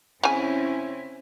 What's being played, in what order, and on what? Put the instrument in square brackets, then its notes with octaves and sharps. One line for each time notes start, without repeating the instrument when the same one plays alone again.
[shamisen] C#3 G#5 [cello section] C4 C#4 E4